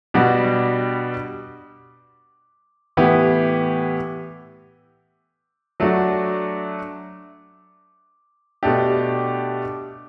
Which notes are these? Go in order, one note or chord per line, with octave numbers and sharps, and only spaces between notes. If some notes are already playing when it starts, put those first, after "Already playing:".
B2 G3 D4 F#4
A2 E3 B3 E4 G4
F#3 A3 D4 F#4
B2 A3 D4 G4